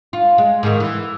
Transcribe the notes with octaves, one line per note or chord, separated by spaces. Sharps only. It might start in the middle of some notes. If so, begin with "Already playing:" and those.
F4
G#3
G#2 D#3
E3